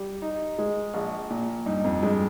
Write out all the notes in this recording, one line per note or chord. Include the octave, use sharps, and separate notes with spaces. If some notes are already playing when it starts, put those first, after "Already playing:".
Already playing: G3
D#4
G#3
A#1
A#2
G2 D#4
F2
G2 G#3